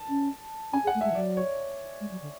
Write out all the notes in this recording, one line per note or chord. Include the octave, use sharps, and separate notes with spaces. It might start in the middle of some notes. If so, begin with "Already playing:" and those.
Already playing: A5
C#4
C#4 G#5
G#4
F#5
A3
G#3 E5
E3
F#3 D5
C#5
G#3
F#3
D3